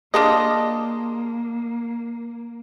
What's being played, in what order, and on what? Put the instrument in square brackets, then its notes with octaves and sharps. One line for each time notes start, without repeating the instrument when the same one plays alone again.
[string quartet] A#3 [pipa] D4 F4 D#5 [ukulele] G#4 A5